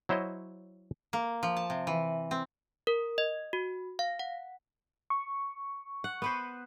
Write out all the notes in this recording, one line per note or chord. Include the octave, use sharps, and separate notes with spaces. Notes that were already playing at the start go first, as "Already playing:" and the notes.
F#3 E4 C5 C#5 D#5
A#3
F3
A5
C3
E3
C4
A#4
D#5
F#4
F5
F#5
C#6
F#5
B3 B4 C5